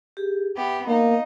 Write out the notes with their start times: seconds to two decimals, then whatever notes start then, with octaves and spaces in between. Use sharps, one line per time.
0.17 G4 G#4
0.56 B3 G4 B4 E5
0.88 A#3 B3 D#4 F5